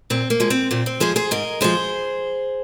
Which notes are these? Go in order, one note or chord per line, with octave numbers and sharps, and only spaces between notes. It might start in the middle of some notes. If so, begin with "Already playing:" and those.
A#2 C4
A#3
F3 G#3
C4
A#2 C4
C4
F3 G#3 G#4 C5
G#4 C5
G#2 A#4 D#5
F3 G#3 G#4 C5